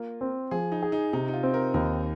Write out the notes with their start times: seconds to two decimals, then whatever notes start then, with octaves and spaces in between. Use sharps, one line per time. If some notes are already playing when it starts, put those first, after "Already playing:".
Already playing: A#3 F4
0.21 C4
0.51 F3 G#4
0.72 D#4
0.83 G#4
0.92 D#4
1.13 C3 D#4
1.28 D#4
1.33 F4
1.43 C4
1.54 A#4
1.74 D#2 A#4